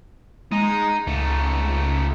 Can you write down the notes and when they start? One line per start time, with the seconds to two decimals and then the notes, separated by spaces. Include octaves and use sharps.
0.52 G#3 D#4
1.07 C#2 A3 D#4